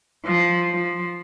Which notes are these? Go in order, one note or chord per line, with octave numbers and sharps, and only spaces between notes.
F3
F3